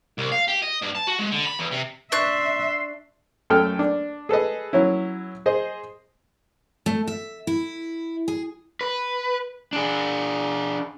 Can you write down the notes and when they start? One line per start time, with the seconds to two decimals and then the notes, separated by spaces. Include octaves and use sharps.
0.18 C2
0.32 F5
0.48 G4
0.62 D#5
0.82 G2
0.95 A5
1.08 F#4
1.19 G#3
1.32 D3
1.46 B5
1.59 E2
1.72 C3
2.12 D4 E5 C6 C#6 F#6
3.50 F#2 A3 A4 G5 F6
3.79 D4
4.29 G#4 A4 B4 D#5
4.73 F#3 C#4 E4
5.46 G#4 C5 D#5
6.86 A3
7.07 E5
7.47 E4
8.28 G#4
8.81 B4
9.73 D4 G#4